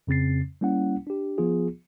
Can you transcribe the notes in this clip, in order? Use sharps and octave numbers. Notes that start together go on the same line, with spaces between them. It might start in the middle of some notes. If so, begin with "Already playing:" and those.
F2 C#3 C4 A6 C7
G3 A#3 C#4 E4 F#5
D4 G4
F3 B3 F4 G#4